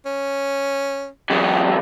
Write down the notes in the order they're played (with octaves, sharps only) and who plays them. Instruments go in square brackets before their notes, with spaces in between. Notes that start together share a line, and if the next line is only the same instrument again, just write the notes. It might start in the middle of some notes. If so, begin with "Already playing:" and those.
[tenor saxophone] C#4
[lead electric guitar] E2 F#3 [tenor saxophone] G#4